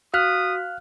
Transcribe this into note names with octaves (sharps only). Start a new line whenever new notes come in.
F#4 F5 D#6 F6 F#6 B6